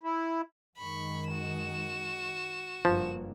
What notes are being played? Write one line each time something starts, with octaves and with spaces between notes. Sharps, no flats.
E4
F#2 D#3 G#3 B5 C#6
F#4 E7
F#1 G2 F3 A#3